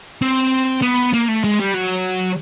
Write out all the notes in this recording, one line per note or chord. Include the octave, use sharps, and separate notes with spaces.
C4
B3
A#3
A3
G#3
G3
F#3